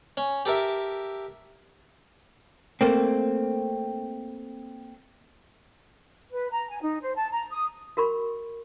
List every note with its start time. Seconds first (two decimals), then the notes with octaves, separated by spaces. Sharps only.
0.17 C#4
0.46 G4 A4 A#4 E5
2.81 A3 A#3 C4
6.31 B4
6.51 A#5
6.69 G#5
6.82 D#4
7.02 C5
7.16 A5
7.31 A#5
7.51 D#6
7.97 F#4 A#4 B5 C#6